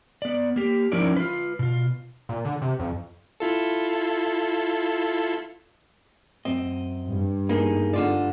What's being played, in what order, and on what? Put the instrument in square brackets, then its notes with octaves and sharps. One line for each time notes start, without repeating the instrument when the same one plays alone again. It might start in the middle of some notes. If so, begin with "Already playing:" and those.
[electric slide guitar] B3 D5
A#3 G4
F3 C#4 D#4 E4 A#4 D5
F4 B4
B2 F4
[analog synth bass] A#2
D3
C3
F2
[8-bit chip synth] E4 F4 A4
[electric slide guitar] F#2 D#5 [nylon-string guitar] C4
[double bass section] G2
[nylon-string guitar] A#3 [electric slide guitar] B3 D#4 G#4
[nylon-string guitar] D3 F4 D5